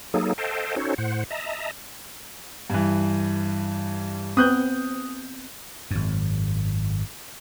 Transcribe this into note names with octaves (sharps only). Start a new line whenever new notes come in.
F#3 A#3 D#4 G#4 A4
A4 C5 D#5 F5 G5 A5
C#4 D#4 F#4 A4 C5 C#5
A2 C5 F#5
D#5 E5 A5 A#5
G2 E3
B3 C4 D#6 F#6 G6
G#1 F#2